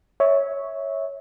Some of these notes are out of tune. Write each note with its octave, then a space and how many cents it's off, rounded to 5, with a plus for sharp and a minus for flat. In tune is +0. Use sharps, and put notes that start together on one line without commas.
C#5 +0 E5 -20